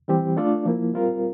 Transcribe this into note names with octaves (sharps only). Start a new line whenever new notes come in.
E3 G3 C4 G4
A3 D4 F4 A4 D5
F3 A#3 E4
G3 C4 F4 A#4